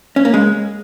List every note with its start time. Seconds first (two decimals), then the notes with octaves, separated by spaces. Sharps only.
0.16 C#4
0.25 A#3
0.34 G#3